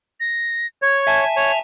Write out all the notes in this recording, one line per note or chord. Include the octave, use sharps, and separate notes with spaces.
A#6
C#5 G#6
E5 G#5 A5
C#5 F7